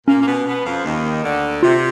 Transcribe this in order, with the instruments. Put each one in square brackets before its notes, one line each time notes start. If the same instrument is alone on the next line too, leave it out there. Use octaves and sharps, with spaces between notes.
[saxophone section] A#2 A#3 [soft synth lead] C#4
[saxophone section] A#3
B2 B3
B2 B3
F2 F3
D#2 D#3
D2 D3
[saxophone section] C3 [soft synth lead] F4